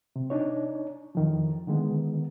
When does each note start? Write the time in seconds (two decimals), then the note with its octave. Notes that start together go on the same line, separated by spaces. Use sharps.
0.16 C3
0.30 D4 D#4 C#5
1.15 F2 D#3 F3
1.67 D3 D#3 G#3 B3